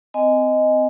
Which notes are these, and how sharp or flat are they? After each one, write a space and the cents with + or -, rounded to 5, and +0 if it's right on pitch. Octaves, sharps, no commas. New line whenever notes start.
C4 -25 D#5 +0 G#5 +0